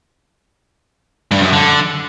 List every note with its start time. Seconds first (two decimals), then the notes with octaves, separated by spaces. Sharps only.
1.31 G2
1.42 F#2
1.53 D3